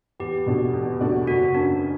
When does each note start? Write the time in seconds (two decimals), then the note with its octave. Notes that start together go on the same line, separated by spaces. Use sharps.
0.20 E2 G4
0.46 B2 A3 D4 F#4
0.74 E2
1.00 B2 A3 D4 F#4
1.27 F#1 F#4
1.54 F#2 C#3 D4